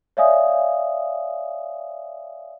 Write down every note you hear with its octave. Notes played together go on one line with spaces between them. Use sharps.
C#5 D5 E5 F5 G#5 D#6